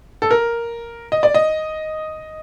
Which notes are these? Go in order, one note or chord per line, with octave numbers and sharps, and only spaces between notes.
A4
A#4
D#5
D5
D#5